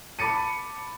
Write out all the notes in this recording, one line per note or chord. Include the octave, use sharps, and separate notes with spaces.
A5 B5 D6 A6 C#7 D#7